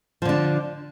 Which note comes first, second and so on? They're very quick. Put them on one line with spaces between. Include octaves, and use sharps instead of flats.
F3 D3 D4